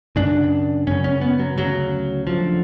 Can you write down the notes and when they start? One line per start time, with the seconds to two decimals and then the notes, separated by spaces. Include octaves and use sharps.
0.16 F#2 C#3 D4
0.87 F#2 C#3 C#4
1.04 C#4
1.21 B3
1.39 F#3
1.57 D2 C#3 F#3
2.27 D2 D3 F3